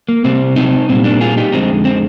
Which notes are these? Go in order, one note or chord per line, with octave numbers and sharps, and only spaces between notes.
A#3
C3 G3 C4
C4 D#4
A#2 G3 C4
A#3 D4
F4 G#4
D#4 G4
F2 D3 G#3 C4 D#4
C4